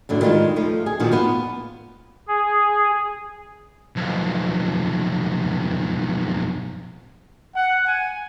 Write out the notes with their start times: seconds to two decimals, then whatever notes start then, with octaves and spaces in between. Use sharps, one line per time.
0.09 F#2 A2 D3
0.21 D#3 G3 G#3 D#4 F4
0.56 F3 A3
0.86 G#4
1.00 A#2 D#3 F3 F#4
1.12 B3 F4
2.28 G#4
3.96 B1 F2
7.55 F#5
7.86 G#5